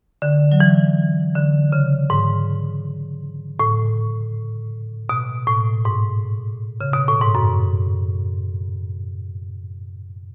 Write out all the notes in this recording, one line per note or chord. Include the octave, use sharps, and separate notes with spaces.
D3
F#3
E3
D3
C#3
G#2
A2
B2
A2
G#2
C#3
B2
A2
G#2
F#2